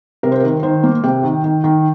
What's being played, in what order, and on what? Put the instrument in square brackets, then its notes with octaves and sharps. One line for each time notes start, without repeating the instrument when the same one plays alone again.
[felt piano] C3 A#4
C5
D#3 A#4
D#3 C5
A#3
C3 G5
D#3
D#3
D#3